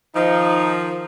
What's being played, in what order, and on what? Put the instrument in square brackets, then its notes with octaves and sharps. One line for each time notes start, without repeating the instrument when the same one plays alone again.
[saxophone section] D#3 F3 [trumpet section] D#4